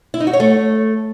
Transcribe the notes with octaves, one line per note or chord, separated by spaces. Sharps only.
E4
D#4
F#4
C#5
A3